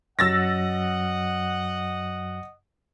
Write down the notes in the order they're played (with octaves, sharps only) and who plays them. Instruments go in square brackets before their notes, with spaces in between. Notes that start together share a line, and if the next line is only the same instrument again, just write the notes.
[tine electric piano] F#2 F#3 [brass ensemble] D#5 F#5 [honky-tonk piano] E6 A6 A#6